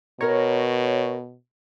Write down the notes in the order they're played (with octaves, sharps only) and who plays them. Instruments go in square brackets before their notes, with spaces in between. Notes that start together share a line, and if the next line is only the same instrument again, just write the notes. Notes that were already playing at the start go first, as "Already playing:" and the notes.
[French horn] B2 [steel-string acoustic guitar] A#4 A#5 [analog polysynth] C#5